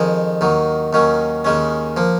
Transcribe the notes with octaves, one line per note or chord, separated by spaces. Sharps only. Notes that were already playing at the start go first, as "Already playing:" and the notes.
Already playing: F2 D#3 G#3
D#2 D#3 F#3
D#2 D#3 F#3 C#4
D#2 D#3 G#3 C#4
F3 A#3